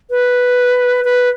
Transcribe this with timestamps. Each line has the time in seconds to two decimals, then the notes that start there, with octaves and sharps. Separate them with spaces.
0.10 B4
1.05 B4